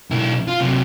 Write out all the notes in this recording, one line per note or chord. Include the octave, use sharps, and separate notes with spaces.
B1 E4
F4
C3 F#3